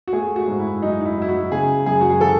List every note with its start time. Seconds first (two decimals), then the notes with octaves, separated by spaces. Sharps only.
0.08 F#4
0.13 A3 G#4
0.36 F#4
0.48 G#2
0.60 E4
0.82 F#3 D#4
1.01 D#4
1.05 E4
1.17 F#3 E4
1.29 F#4
1.52 C#3 G#4
1.86 F#2 G#4
2.01 F#4
2.10 G#4
2.20 E3 A4